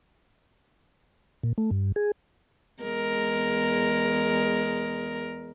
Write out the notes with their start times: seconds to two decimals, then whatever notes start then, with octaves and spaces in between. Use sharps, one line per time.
1.43 A#2
1.58 A3
1.71 G2
1.96 G#4
2.82 E2 G#3 A#4